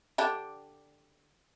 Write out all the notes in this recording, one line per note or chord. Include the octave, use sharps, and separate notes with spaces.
D3 D4 G4